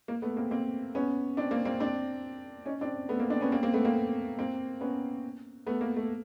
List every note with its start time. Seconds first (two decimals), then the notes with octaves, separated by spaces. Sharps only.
0.08 A#3
0.22 A3 B3
0.37 A#3 C4
0.51 A#3 C4
0.95 B3 C#4
1.37 C4 D4
1.51 A#3 C4
1.65 A#3 C4
1.80 C4 D4
2.66 C#4 D#4
2.81 C4 D4
3.09 A3 B3
3.20 A#3 C4
3.30 C4 D4
3.41 B3 C#4
3.52 A#3 C4
3.63 A#3 C4
3.74 A3 B3
3.85 A#3 C4
4.39 A#3 C4
4.81 B3 C#4
5.67 A3 B3
5.81 A#3
5.96 A3